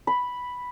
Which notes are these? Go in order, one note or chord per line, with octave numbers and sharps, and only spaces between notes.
B5